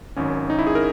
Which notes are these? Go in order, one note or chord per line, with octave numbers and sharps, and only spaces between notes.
G#1 F#2 D#3 C#4
D#4
E4
G#4
A#4